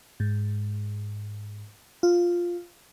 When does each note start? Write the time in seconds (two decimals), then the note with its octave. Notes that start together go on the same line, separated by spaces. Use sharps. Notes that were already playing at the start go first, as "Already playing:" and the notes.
0.20 G#2
2.03 F4